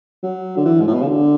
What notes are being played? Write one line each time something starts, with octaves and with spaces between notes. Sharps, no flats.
F#3
D3
E3
G#2
A2
B2
C#3
D3